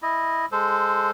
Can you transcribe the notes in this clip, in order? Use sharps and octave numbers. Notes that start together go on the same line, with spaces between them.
E4 D#5
G#3 A4 C5